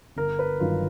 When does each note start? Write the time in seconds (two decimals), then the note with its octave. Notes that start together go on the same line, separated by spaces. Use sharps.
0.16 G1 A#4
0.39 B4
0.60 G2 D#3 F#3 F4